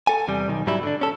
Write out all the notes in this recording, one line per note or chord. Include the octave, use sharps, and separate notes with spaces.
A4 G#5
E2 C3 G3
B1 D#3
G#2 F#3 G3 E4
D3 D4
C#4 A4